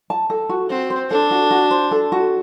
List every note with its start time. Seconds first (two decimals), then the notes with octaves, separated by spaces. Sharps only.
0.10 A5
0.30 A4
0.49 F#4
0.70 C4 F#4
0.90 C5
1.10 D4 A4
1.31 F#4
1.51 F#4
1.71 C5
1.91 A4
2.12 F#4